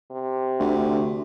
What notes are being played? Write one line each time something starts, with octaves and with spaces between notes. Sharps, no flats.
C3
D2